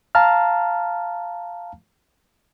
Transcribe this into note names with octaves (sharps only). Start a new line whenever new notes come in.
F5 A5 A#5 F6